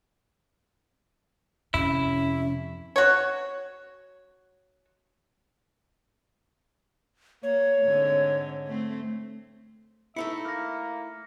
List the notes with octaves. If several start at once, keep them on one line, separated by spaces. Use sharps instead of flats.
F2 C3 C#4 E4
F#4 C#5
A#3 C#5
G#2 D3 C4
A3 C4
A3 D#4 E4 E5 C#7
A#3 F6 A#6